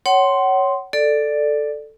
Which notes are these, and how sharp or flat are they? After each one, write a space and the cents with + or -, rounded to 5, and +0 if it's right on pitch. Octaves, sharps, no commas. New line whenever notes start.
C#5 +0 F#5 +35 C6 +0
A4 +0 D5 +10